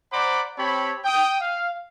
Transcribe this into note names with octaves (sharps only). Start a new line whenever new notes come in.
C5 D5 F#5 A#5 B5 D6
C4 G4 C#5 A5 B5
G5 D#6
F5